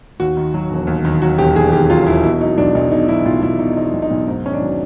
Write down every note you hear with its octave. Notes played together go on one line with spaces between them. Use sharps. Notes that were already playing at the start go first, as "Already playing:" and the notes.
D#2 F#4
D#3
F#3
E1
D#2
D#3
F#3 F#4
E1 G4
D#2 G#4
D#3 G4
F#3 F4
E1 E4
B2 E4
F#3 D#4
B1 D4
B1 D#4
B2 D#4
F#3 E4
B1 F4
B1 E4
B2 D#4
F#3 D#4
B1
D#4
B1
G#2 D#4
D#3 C#4
D4
F#3